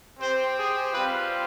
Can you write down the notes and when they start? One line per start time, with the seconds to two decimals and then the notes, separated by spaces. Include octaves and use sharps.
0.20 C4 G4 C5
0.57 G#4
0.93 G3 C4 F4 B4